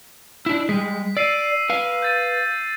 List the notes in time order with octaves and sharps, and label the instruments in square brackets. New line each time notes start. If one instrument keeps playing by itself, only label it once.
[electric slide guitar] D4 E4
[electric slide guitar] G3 G#3 [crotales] B6
[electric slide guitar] D5 [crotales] E6 C7 D#7
[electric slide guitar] B4 F5
[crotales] G6 A6 D#7